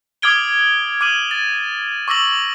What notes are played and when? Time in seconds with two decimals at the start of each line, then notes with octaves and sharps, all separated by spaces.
0.22 D6 D#6 F6 G#6 D7 G7
1.01 D6 F6 D#7 F#7
1.31 A6
2.08 C#6 D6 E6 A#6 F#7